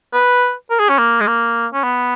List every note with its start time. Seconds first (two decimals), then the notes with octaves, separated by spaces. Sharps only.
0.13 B4
0.70 A#4
0.79 G#4
0.89 C#4
0.98 A#3
1.20 G#3
1.27 A#3
1.73 C#4
1.83 B3